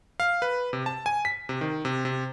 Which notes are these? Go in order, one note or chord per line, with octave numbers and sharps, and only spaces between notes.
F5
B4
C3
A5
G#5
B6
C3
D#3
C3
C3